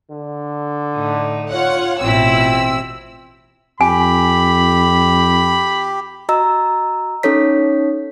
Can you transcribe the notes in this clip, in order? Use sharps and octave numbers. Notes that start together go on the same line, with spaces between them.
D3
A2 D#4
F4 C#5 F#5
A1 B2 C4 E4 F4 E6
F2 G4 G#5 B5
F#4 D#5 A#5 E6
C#4 D#4 A4 C#5 B6